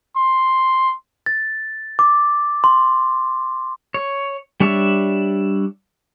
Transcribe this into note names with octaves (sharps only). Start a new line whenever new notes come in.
C6
A6
D6
C6
C#5
G3 D4 C#5 D5 E5